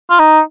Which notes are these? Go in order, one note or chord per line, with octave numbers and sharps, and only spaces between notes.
F4
D#4